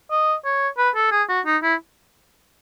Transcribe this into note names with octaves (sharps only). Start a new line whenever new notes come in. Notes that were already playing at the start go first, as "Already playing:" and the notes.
D#5
C#5
B4
A4
G#4
F#4
D#4
E4